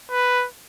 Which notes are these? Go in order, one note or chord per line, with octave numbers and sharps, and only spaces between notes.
B4